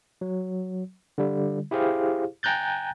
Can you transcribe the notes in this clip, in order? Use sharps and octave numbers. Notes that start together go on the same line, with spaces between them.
F#3
D3 G3
E4 G4 G#4 C5 F5
G5 G#5 A#5 F#6 G6 A6